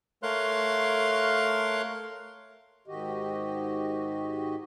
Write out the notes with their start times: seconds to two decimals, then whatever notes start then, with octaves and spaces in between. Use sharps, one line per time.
0.23 A3 A#4 C#5 F5 C6 F#6
2.88 G#2 D#3 F#4 G4 D#5